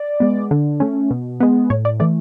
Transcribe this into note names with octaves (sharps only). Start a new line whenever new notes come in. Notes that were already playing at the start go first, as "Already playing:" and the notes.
Already playing: D5
G#3 B3
D3
A3 C#4
B2
G#3 B3
A2 C#5
D5
E3 A3 D5